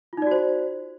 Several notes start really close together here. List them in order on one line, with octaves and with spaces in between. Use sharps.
F4 D#4 D5 F#4 C5